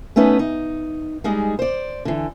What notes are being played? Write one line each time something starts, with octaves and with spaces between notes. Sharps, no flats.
A3 B3 C#4 D#4 B4
D#4
G3 G#3 D#4 G#4
C5 D5
D3 E3